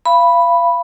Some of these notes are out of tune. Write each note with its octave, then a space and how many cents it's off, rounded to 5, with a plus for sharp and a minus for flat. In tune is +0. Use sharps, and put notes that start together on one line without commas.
F5 -30 B5 +0